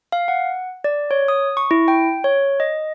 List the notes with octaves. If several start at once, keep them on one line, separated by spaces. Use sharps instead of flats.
F5
F#5
D5
C#5
D#6
C#6
E4
G5
C#5
D#5